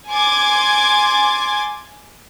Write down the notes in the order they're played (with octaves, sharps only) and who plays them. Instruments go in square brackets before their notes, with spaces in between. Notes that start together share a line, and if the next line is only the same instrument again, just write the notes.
[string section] G#5 C6 D6 G#6 A6